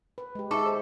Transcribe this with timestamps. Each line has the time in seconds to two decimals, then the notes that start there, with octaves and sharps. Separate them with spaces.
0.18 B4
0.35 G#3 G4
0.51 D#4 G#4 A4 E5 C#6 D6
0.66 C5